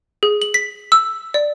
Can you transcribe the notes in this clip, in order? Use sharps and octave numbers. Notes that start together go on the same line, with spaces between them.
G#4
F#7
B6
E6
D5